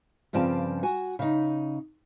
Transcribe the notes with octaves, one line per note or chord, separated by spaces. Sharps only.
G2 C#3 F3 C4 D5 A5
F#4 F#5 G#5
C#3 D#4